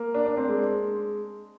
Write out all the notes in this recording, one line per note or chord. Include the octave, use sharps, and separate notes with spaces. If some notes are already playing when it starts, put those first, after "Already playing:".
Already playing: A#3
D4
D4
C4
G#3